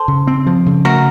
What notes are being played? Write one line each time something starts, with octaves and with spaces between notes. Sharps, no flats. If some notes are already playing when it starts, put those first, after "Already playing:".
Already playing: A4 C5
C#3
C4
F3
C#3
A3 F#4 A#4